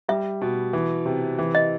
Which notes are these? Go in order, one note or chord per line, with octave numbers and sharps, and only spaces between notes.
G3 E5
B2
E3
C3
E3
D#5